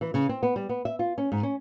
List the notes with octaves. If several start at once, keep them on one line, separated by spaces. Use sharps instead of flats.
E3
C#3
C4
B3
G3
B3
E5
F4
C#4
G#2
C#4